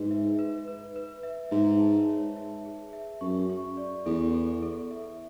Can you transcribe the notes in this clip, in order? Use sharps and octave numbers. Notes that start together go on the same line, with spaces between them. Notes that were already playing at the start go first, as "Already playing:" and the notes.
Already playing: G#2 B4
E5
B4
B4
B4
E5
G#2 E5
A5
C#5
E5
G#4
E5
F#2 C#6
C#6
D5
E2 A4
A4
A4
E5